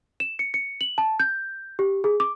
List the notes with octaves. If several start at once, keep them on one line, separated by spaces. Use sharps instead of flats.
E7
C#7
C#7
F#7
A5
G6
G4
G#4
D6